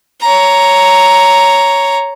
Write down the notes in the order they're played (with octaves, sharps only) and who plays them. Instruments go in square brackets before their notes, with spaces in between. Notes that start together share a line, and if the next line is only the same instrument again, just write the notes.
[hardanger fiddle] C#5 A#5